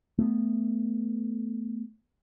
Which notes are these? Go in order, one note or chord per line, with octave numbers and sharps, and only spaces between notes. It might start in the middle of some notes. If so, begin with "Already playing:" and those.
A3 B3